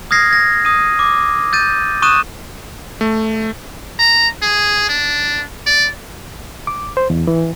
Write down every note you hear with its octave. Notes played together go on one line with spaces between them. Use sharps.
D#6 F6 G#6 A#6 C7
G#6 A#6
D#6 D#7
D6
E6 G6 A6 D#7
C#6 D#6 F#6 D#7 E7
A3
A#5
G#4
D4
D5
D6
C5
E2
E3